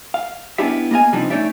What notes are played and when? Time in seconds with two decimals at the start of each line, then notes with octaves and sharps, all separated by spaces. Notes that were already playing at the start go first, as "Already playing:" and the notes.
0.14 F5
0.58 B3 C#4 D4 E4 G4 E5
0.91 A#3 B3 D#5 F5 G#5
1.13 C3 F3 G3 C4 D4 D#4
1.30 A3 C#4 D#4 C#5 D5 E5